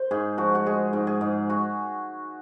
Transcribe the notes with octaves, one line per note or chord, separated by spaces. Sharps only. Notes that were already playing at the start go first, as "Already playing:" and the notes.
Already playing: C5
G#2 G#4
F3 F#4
F#4
G#3 G#4
G#2
G#4
G#2
F#4